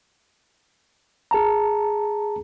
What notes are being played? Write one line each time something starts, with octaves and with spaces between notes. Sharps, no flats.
G#4 A5 A#5